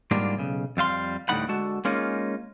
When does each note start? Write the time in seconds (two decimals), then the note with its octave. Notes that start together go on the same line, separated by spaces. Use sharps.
0.11 G#2 G3 A#3 D4 F4
0.37 B1 C#3
0.77 F2 G3 F5 C6
1.29 D2 A2 G3 D#4 F#5 B5
1.48 D3 G#3 F#4 A5
1.85 G#3 A#3 C#4 D#4 F4